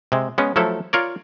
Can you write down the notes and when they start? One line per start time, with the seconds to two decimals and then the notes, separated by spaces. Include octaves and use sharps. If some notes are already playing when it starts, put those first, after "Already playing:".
0.12 C3 G#3
0.38 G#3 B3 C#4
0.56 F3 F#3 A3 E4 A4
0.93 F4 A#4 C#5 D5